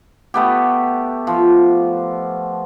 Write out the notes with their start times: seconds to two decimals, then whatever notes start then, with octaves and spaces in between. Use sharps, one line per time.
0.34 A3 B3 G4
1.27 F3